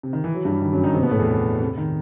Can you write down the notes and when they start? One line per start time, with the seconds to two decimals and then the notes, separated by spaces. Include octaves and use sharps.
0.03 C3
0.13 D#3
0.24 E3
0.34 F#3
0.45 G2 G3
0.62 D#3
0.73 F#2 F#3
0.84 D#3 D#4
0.94 C3 C4
1.03 B2 B3
1.11 A2 A3
1.19 E2 E3
1.61 C3
1.78 D#3